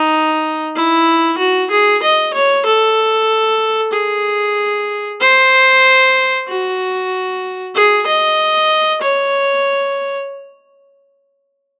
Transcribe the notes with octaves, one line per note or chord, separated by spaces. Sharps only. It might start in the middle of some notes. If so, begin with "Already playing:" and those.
Already playing: D#4
E4
F#4
G#4
D#5
C#5
A4
G#4
C5
F#4
G#4
D#5
C#5